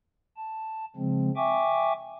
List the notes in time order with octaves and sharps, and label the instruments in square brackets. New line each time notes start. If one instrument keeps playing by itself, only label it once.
[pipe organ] A5
C#3 F3 G#3 C4
E5 G5 G#5 C#6 D6